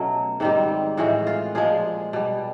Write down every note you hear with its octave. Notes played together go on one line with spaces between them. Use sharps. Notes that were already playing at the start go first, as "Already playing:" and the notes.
Already playing: B2 F#3 A3 C#4
G#2 D#3 G3 C4
A2 E3 G#3 F#4
F4
A#2 F3 G#3 G#4
B2 G3